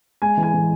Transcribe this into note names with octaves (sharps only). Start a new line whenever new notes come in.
G#3 G#5
E3
G#5
E3